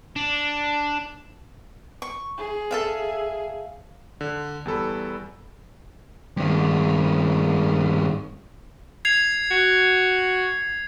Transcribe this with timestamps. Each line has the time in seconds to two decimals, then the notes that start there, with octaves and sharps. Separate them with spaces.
0.16 D4
2.02 C#6
2.38 G#4
2.71 A4 E5 F5
4.21 D3
4.65 E2 G3 A4 B5
6.37 G2 D#3
9.05 G#6 C7 F7
9.51 F#4